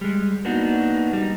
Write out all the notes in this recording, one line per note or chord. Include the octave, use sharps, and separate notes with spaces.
G3 G#3
A#3 B3 D4 D#4 F#4
G3 D#4